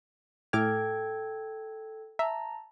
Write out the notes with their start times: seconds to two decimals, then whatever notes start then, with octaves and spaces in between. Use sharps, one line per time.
0.53 A2 A4 G5 D6 F6 G#6
2.19 E5 A5 A#5